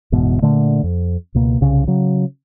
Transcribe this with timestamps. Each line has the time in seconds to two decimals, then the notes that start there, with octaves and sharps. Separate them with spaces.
0.12 F#1 E2 G#2 B2
0.42 A#2 D3 A3
0.84 F2
1.35 C#2 B2 A#3
1.61 C2 C#3
1.87 C#3 F#3